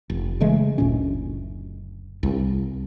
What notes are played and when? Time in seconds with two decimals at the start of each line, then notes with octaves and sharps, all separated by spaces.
0.10 F1
0.40 C#3 E3 G#3 A3
0.78 F#1 D2 A#2 C#4
2.23 C2